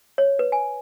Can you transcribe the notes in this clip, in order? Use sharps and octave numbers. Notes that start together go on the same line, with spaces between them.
C#5
B4
G#5